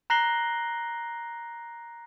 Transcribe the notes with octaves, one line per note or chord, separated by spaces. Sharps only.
A#5 F#6 A#6 C7 F#7 G7